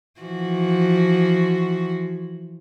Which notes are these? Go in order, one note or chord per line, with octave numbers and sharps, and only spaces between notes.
E3 F3 F#4